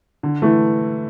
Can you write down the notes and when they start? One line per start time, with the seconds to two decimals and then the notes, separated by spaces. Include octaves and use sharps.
0.23 D3
0.42 E3 A3